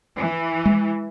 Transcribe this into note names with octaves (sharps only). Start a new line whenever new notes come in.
E3
G#3